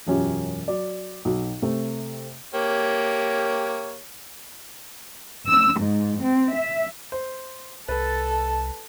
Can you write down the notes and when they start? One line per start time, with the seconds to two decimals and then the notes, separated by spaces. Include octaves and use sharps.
0.07 E1 F#2 C#4 F4 G4
0.68 F#3 D5
1.25 B1 F#4
1.62 C3 A3
2.55 A#3 G4 C#5
5.47 E6
5.80 G#2
6.21 C4
6.54 E5
7.12 C5
7.88 C2 A4 B4 A5